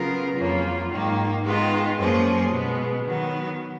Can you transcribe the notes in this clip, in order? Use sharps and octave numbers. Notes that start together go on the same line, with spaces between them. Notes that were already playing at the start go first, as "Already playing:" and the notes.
Already playing: C#3 F#3 B3 F4 A#4
F2 C#3 F#3 A#3 F4
G#2 D#3 A#3
D#3 G#3 B3 F4
F#2 F3 A#3 C#4 G#4
B2 G#3 B3
D#3 F#3 B3